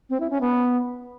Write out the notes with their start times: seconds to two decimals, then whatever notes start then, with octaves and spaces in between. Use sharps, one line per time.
0.10 C4
0.20 E4
0.30 C#4
0.41 B3